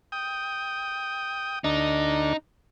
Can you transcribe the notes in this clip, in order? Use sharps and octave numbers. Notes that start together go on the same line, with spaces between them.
G5 D#6
D2 D4 D#4